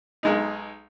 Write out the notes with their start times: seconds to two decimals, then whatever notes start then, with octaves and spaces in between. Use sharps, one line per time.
0.23 B1 G#3 D#4